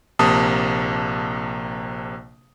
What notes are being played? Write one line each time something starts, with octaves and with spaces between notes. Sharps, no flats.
A#1 C3 A#3 A5 D#6